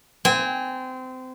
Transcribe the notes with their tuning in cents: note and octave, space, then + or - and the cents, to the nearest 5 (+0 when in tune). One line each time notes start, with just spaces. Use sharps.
C4 -25 G#5 -20